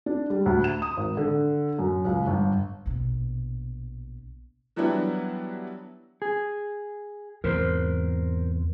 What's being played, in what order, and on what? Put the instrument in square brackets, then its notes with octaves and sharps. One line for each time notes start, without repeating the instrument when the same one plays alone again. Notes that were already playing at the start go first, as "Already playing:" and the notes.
[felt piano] D4
G3
D2
E7
D#6
G#1
D3
F#2
C#2
G1
[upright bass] A#1 B2
[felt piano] E3 F#3 G3 B3 D4 E4
[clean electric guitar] G#4
[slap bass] E2 G#2 C3 [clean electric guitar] A#4 C5